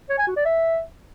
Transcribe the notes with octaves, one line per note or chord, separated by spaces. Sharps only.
C#5
G#5
F#4
D5
E5